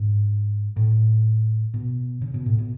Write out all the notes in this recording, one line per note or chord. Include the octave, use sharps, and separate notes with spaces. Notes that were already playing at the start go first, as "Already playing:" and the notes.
Already playing: G#2
A2
B2
C#3
B2
A2
B2